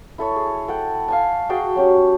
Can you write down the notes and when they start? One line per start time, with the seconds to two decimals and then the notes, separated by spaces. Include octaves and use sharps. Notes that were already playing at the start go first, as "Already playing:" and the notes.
0.18 E4 A4 C#5
0.36 G#4
0.68 A4 F#5 G5
1.08 F5 G#5 A5
1.49 F#4 G#4 G5 A5
1.76 F#3 C#4 G4